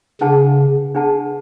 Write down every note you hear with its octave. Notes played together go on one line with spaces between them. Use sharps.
C#3 D4 G#4 B4 F#5 A5
D4 G#4 B4 F#5 A5